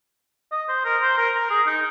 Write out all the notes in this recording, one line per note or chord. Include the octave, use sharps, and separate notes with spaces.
D#5
C5
A#4
C5
A#4
A#4
G#4
D#4